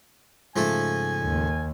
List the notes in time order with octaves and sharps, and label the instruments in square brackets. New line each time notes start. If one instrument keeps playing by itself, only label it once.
[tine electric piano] G#2 C#3 [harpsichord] F3 A3 A4 [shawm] G#5
[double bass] D#2